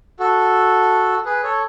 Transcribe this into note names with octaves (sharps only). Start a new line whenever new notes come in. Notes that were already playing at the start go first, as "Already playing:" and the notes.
F#4 A4
G#4 B4
A4 C#5